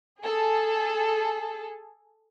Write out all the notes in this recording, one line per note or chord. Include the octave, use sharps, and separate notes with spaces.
G#4 A4